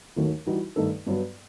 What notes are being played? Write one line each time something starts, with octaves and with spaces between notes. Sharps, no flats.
D#2 D#3 F#3 A3
E3 G3 D#4 F#4
G2 D#3 A3 D#4 A4
G2 F#3 B3